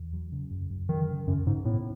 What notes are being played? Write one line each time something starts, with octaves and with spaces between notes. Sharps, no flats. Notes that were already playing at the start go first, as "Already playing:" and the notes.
Already playing: E2
F#3
C#3
F#2
F#2
D#3 F#3
C#3
F#2 C#3
G#2 C#3
A2 B3